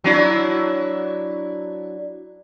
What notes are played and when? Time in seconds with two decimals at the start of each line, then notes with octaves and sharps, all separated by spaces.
0.04 F#3 D4 E4